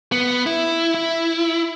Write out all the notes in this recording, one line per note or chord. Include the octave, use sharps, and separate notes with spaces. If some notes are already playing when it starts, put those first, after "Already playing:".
B3
E4
E4